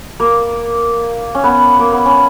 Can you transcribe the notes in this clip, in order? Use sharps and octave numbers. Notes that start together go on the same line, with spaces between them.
A#3
C#4
B3
A#3
B3
C#4